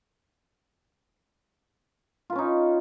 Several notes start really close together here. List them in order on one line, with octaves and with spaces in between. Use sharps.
F4 B4 C#4 D#4